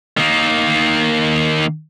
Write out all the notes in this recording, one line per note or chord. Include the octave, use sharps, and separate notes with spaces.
D#3 A#3